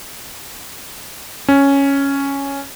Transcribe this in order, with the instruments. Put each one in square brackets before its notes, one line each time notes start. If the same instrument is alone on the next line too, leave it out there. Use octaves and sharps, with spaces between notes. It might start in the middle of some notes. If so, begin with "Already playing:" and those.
[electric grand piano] C#4